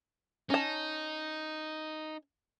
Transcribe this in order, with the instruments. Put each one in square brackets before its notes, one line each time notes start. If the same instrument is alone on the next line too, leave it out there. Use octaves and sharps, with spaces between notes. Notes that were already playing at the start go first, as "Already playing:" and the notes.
[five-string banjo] C#4 A5 [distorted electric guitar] D#4